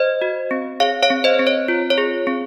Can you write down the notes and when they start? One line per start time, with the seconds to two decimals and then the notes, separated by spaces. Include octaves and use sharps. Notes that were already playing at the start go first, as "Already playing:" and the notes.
Already playing: C5 D#5
0.22 F#4
0.51 C4
0.80 G#4 C#5 F5
1.03 C#5 F5
1.10 C4
1.24 C5 D#5
1.39 C4
1.47 C#5
1.68 F4
1.90 C#5
1.98 G#4
2.27 C4